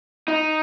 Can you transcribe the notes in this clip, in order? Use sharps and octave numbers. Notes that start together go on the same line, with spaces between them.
D#4